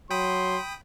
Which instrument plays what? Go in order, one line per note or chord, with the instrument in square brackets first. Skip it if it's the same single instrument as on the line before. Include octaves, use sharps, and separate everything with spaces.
[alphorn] F#3 [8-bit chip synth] G5 B5 D#6 [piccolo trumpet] C6